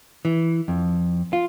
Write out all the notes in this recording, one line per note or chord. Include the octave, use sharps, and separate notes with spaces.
E3
F2
F4